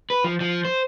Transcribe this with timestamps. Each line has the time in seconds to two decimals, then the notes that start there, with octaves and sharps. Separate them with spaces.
0.10 B4
0.24 F3
0.40 F3
0.65 C5